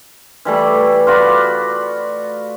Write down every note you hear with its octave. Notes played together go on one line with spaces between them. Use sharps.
E3 G3 A3
F4 F#4 D5 B5